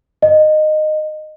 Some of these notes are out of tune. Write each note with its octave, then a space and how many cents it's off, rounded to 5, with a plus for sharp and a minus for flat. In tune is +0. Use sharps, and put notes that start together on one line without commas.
D#5 -15